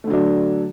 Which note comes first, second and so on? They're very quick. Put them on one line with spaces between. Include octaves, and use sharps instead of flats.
A3 D3 F#3 D4